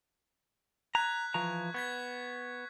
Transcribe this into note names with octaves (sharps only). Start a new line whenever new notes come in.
A#5 F#6 G#6 B6
E3 F3 A#5 C#6
B3 C#6 G#6 B6